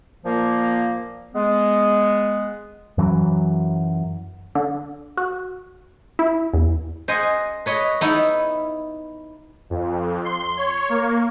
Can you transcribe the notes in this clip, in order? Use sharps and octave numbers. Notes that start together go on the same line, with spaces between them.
A#2 F3 A#3
G#3 B3
F#2 E3 F#3
D3
F#4
E4
E2
C5 D#5 F#5 G#5
B4 C#5 D#5
B3 D#4 E4
F2
C6
C#5
A#3